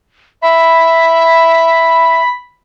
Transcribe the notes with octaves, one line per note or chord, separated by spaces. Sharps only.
E5 B5